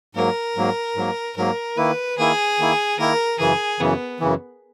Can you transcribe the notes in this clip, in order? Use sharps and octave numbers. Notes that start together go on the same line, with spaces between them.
G#2 F#3 A#3 A#4
G#2 F#3 A#3
G#2 F#3 A#3
G#2 F#3 A#3 A#4
D#3 A#3 E4 B4
D#3 A#3 E4 G#4
D#3 A#3 E4
D#3 A#3 E4 A#4
F#2 C#3 E3 G#4
F#2 C#3 E3 B3
F#2 C#3 E3